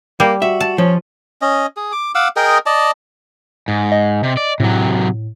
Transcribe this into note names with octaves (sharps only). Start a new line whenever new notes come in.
G3 A#3
F#4 E5
A5
F3 C#4
C#4 D#5
G#4
D6
F5 F#5 D6 E6
G#4 A#4 D#5 G5
D5 D#5 A5
G#2
D#5
C3
D5
A2 C3 F#3